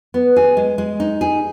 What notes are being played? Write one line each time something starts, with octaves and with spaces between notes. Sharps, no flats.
B3
G#4
G#3
G#3
D#4
G#4